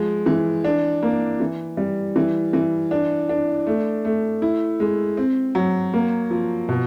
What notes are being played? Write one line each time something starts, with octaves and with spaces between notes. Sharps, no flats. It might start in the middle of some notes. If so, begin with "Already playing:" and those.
Already playing: F3 G#3
E3
D4
A#3
E3
G3
E3
E3
D4
D4
A3
A3
E4
G#3
C4
F#3
A#3
F3
B2